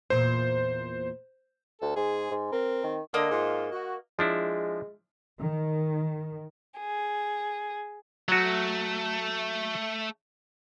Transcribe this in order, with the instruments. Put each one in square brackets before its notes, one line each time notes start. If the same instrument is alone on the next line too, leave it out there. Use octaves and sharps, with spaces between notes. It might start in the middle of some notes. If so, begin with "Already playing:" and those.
[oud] E2 A#2 [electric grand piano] C5
[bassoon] D2 [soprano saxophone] A4
[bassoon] G#2 [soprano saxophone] G#4
[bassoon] G#2
[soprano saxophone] C4 [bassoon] A#4
[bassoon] D#3
[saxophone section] D3 [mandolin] A#3 D#5
[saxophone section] G#2 F4
F#4
[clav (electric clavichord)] F3 D4 E4 [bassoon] G#3
[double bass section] D#3
[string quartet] G#4
[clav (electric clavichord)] F#3 F#4 [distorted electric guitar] A3